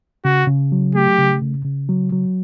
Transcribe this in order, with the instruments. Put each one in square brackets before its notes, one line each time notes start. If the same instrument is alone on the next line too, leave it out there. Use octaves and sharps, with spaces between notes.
[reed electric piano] C#3 [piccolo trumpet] F#4
[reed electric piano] C#3
F#3
[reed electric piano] A3 [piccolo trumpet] G4
[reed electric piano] C#3
C#3
C#3
F#3
F#3